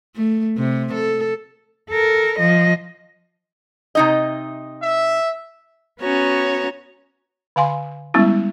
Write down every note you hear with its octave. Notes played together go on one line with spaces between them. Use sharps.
A3
C3
A4
A4 A#4
F3 D#5
C3 D#4 D#5
E5
B3 C#4 F#4 C#5 A#5
D3 F5 G#5 C6
G3 G#3 B3 C#4 E4